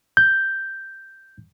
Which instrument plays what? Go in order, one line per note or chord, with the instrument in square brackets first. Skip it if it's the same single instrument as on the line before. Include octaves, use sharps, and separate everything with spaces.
[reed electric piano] G6